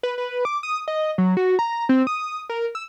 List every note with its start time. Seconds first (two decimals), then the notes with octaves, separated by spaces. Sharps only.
0.03 B4
0.18 B4
0.45 D6
0.63 D#6
0.88 D#5
1.18 F#3
1.37 F#4
1.59 A#5
1.89 C4
2.07 D#6
2.49 A#4
2.75 E6